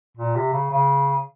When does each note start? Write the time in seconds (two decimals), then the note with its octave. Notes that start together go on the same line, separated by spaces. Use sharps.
0.17 A#2
0.36 C3
0.53 C#3
0.71 C#3